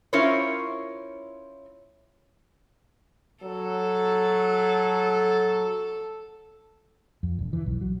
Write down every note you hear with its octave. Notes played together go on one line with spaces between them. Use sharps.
C#4 E4 F4 A#4 C5 C#5
F#3 A4
F2
E1
E3
B1
F#3